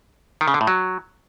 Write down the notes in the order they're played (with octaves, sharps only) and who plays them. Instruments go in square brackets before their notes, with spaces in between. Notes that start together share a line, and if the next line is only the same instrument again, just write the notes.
[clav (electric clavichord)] D#3
C#3
D3
A2
F#3